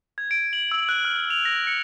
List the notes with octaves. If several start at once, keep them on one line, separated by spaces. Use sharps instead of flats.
G#6
D7
F#7
E6
F#6
F6
F7
A#6
C#7